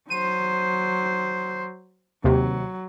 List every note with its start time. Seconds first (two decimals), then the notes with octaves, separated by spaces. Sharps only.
0.10 F#3 C5 D#7
2.24 D#2 C3 F#3